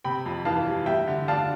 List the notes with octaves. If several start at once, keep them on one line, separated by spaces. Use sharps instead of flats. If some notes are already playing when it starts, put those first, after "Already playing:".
C3 G5 B5
F2
E3 F5 A5
G3
G3 E5 G5
D3
D4 F5 A5